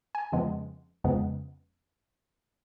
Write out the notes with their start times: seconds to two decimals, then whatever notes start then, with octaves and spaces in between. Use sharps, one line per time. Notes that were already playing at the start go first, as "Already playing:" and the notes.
0.15 G#5
0.32 F2 C#3 F3 G#3 B3
1.04 F2 C#3 F3 G#3 B3